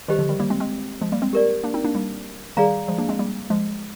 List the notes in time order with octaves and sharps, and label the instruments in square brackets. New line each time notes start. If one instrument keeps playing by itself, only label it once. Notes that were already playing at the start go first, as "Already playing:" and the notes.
[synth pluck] D#3 G3 [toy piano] G4 C5 D#5
[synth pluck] D3 F3
D#3 G3
G3 A#3
G#3 C4
G#3 C4
F3 G#3
G3 A#3
G#3 C4
[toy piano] G4 A#4 D5
[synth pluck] A#3 D4
C4 D#4
A#3 D4
G3 A#3
[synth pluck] D#3 G3 [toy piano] G#4 D5 F5 A#5
[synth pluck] F3 G#3
A#3 D4
G#3 C4
G3 A#3
F3 G#3